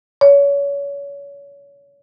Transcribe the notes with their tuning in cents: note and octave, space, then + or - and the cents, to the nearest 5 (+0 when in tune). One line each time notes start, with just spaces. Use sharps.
C#5 +30